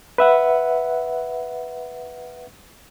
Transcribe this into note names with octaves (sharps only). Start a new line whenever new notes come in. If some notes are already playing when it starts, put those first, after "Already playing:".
B4 E5 F#5